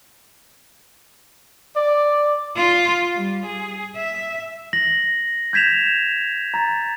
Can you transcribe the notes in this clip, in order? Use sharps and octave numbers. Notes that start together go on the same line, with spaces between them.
D5
F4
G3
G#4
E5
A#6 F#7
G6 G#6 B6 E7 F7
A#5 A6